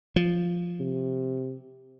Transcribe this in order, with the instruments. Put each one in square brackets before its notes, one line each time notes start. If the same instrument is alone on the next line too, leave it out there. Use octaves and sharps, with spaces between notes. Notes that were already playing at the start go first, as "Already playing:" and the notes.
[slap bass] F3
[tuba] C3